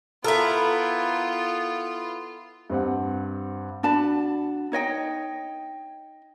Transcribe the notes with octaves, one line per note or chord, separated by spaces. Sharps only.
B3 E4 F4 A4 A#4
G2 C4 F#5
D4 F#4 A5 B5
D#4 C#5 D#5 G5